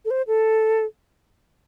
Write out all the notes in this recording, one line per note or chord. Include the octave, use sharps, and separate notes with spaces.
A4
C5
A4